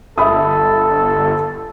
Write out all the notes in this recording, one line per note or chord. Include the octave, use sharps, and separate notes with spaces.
G1 A4 E5 B5 D#6